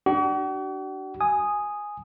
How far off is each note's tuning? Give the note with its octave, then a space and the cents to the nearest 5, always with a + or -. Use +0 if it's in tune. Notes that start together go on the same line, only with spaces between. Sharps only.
D4 +15 F#4 +45
G#5 +0 D#6 +0